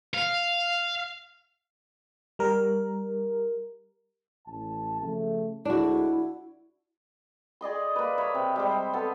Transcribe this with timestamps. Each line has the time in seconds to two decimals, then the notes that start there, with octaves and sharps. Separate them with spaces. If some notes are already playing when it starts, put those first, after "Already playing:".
0.14 F5
2.39 G3 A#4
4.46 A1 A5
5.01 C#3 F3 A3
5.65 D2 G#3 D4 E4 F#4
7.61 G#4 D5 D#5 C6
7.96 A#3 B4
8.18 B4 C#5 E5
8.35 C3
8.56 G3 G#3 C5
8.94 B3 A4